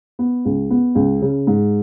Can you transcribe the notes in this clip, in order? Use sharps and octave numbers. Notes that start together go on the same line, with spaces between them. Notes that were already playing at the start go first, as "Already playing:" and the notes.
B3
C#2
B3
C#2
C#3
G#2